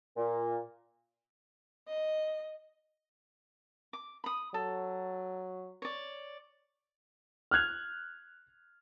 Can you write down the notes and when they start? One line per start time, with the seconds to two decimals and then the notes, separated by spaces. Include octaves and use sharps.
0.17 A#2
1.89 D#5
3.93 D6
4.24 B5 D#6
4.54 F#3 A4
5.82 C#5 D5
7.51 F6 F#6 G#6 F7